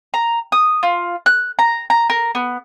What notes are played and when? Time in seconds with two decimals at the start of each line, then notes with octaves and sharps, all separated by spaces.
0.14 A#5
0.52 D#6
0.83 F4
1.26 F#6
1.59 A#5
1.90 A#5
2.10 A#4
2.35 B3